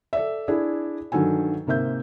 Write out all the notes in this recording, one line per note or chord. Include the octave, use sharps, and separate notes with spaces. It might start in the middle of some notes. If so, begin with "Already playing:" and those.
A4 D5 E5
D4 E4 G#4 D5
G2 D#3 F#3 A4 G#5
G#2 C3 A#3 E5 G6